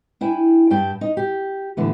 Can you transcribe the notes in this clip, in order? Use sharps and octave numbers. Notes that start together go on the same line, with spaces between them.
D4 E4 G5 G#5
G2 G4 G5 A5
D#4
G4
A2 D3 E3 B3